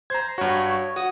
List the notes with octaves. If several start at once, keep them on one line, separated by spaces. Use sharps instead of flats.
C5 A#5 G#6
G2 F#4 C#5
F#4 D#6